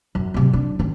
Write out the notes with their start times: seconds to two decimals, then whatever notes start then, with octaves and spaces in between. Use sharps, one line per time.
0.15 F#2
0.34 C3 F#3
0.53 D4
0.79 D#3 C#4